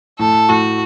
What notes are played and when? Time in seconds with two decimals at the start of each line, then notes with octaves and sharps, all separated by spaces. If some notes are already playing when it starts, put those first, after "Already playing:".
0.19 A2 A4
0.49 A2 F#4